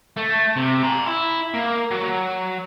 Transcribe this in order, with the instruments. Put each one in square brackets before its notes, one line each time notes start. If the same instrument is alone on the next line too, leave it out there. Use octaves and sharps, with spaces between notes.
[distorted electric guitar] A3
C3
A#5 C6
E4
A#3
F#3